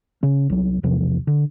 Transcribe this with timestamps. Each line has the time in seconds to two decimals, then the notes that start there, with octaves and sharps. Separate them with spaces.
0.23 C#3 C#4
0.50 C2 F#3
0.83 B1 E2 C3 F3
1.27 D3